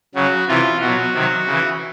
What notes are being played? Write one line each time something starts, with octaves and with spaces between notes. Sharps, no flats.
C#3 F#3 F#4
C3 E3 F4
B2 F#3 F#4
C3 D#3 F#3
C#3 E3